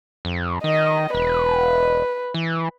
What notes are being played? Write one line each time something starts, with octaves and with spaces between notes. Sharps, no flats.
F2
D#3 D#5
E1 B4
E3